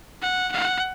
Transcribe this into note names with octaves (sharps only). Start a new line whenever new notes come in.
F#5
F#5